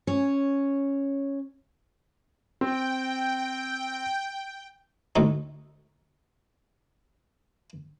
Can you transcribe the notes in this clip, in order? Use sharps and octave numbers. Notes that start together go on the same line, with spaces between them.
C#4 C#5
C4 G5
D2 A2 D#4